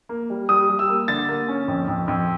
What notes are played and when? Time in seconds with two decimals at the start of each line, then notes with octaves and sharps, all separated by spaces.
0.09 A#3
0.30 G3
0.49 G3 D#6
0.69 G3
0.79 E6
0.89 A#3
1.08 D3 A6
1.29 A#3
1.48 C#4
1.68 F2
1.88 F2
2.08 F2